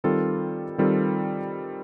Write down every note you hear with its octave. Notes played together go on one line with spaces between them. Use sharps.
D#3 G3 C4 F4 A4
D#3 G3 C4 F4 A4